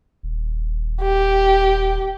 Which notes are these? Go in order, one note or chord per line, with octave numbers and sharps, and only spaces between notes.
D#1
G4